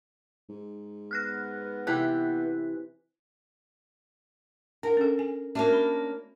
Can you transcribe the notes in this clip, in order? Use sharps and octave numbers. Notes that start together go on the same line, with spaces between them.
G#2
B3 F6 F#6 A#6
C3 E3 G4 F#6 B6
D4 A#4 F#5
C#4 A4
G#5
A#3 C#4 D4 F#4 A#4 E5
B5